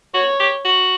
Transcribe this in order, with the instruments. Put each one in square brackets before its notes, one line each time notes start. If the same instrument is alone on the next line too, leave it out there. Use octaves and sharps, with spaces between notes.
[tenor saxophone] F#4 [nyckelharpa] C#5
[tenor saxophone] G4
F#4